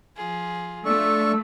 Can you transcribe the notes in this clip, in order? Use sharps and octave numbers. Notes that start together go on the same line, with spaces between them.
F3 F4 G#4
A3 D4 F4 A4 C#6 E6